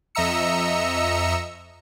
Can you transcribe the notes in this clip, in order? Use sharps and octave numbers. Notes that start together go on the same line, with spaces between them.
F2 D#5 E5 A#5 E6 C#7